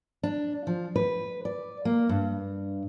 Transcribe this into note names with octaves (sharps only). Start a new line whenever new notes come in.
D4
F3
B4
D5
A#3
G2